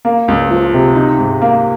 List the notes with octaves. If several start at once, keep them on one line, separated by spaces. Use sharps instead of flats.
A#3
C#2
F3
C3
D#4
G#2
A#3